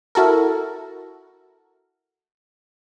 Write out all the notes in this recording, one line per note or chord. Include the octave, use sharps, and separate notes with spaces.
E4 F#4 A4 A#4